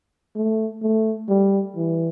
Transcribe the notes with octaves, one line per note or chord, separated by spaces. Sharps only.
A3
A3
G3
E3